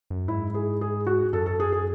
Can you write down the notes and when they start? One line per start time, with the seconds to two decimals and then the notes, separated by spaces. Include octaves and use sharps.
0.10 F#2
0.28 G#2 E4
0.54 G#4
0.81 G#4
1.07 F#4
1.33 F#2 A4
1.46 A4
1.60 G#4
1.72 G#4